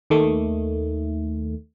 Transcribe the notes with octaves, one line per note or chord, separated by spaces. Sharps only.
D#2 D#3 A3